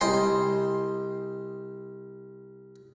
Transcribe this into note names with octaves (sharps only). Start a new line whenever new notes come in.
C2 D#5 G5 G#5 C6